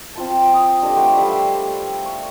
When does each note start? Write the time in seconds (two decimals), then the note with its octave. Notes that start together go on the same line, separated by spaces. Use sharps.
0.15 C4 F4 A5
0.54 D#6
0.82 D4 G4 A4 D#5
0.97 A3 B4 C5 F#5
1.17 G3 E5 F5 D6
2.06 C#6